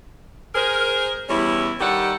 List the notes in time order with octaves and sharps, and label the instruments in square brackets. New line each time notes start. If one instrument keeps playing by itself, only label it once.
[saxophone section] G#4 A#4 C5
E2 G3 C#4 E4
D#3 G3 G4 A4 D5 F#5